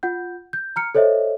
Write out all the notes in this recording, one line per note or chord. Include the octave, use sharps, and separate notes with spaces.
F4 F#5 G6
G6
A#5 F6 C#7
A4 C5 C#5 D#5 E5